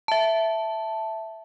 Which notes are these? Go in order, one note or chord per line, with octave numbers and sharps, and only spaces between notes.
E5 A5